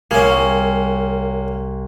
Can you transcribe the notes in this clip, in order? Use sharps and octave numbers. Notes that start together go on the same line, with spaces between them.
C2 A#3 C#4 G#4